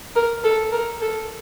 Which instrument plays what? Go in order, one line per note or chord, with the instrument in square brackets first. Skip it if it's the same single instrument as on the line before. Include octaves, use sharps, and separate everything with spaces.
[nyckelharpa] A#4
A4
A#4
A4